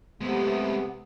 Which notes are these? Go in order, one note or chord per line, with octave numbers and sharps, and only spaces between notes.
C3 G#3 A3 B3